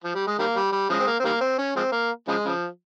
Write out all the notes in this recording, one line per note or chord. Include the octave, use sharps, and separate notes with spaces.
F3
G3
G#3
D#3 G3 A#3
G3
G3
C#3 F3 G#3
C4
A#3
C4
D#3 G3 A#3
C4
C#4
F3 G#3 C4
A#3
C#3 F3 G#3
C#3 F3